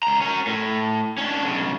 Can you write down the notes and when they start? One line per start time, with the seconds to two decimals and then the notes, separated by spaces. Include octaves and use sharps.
0.03 C#2 A#5
0.22 C#4 A#4
0.47 A2
1.18 C#4 D4
1.45 B1 C#3